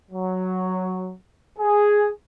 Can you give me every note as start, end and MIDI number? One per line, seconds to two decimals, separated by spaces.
0.12 1.14 54
1.58 2.09 68